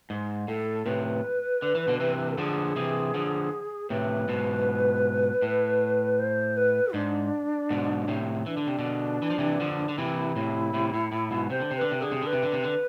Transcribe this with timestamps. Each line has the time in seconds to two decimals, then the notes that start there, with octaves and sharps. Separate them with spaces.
0.10 G#2
0.48 A2 A4
0.86 A2 C3 B4
1.62 D3
1.75 E3
1.88 B2 D3
2.00 C3 E3
2.38 D3 F3 G#4
2.76 C3 E3
3.14 D3 F3
3.90 A2 C3 B4
4.28 G#2 B2
5.42 A2
6.18 C5
6.57 B4
6.94 G#2 D4
7.70 G#2 B2
8.08 A2 C3
8.46 E3 D4
8.57 D3
8.68 C3
8.79 B2 D3
9.22 E3
9.30 F3
9.38 C3 E3
9.60 D3 F3
9.89 D3
9.98 C3 E3 E4
10.36 A2 C3
10.74 A2 C3
10.94 A2
11.12 A2
11.31 G#2 B2
11.50 C3 C5
11.60 D3
11.71 C3 C5
11.78 D3 B4
11.91 C3
12.01 D3 G#4
12.12 C3
12.22 D3 B4
12.33 C3
12.43 D3
12.53 C3
12.64 D3